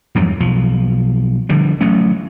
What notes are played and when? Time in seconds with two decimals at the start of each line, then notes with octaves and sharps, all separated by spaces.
0.15 E2 G2 F3 F#3
0.40 B1 F3
1.49 D3 F3 G3
1.81 A1 F#3 A3 C#4